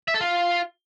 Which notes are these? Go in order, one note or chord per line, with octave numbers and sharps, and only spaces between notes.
E5
A4
F4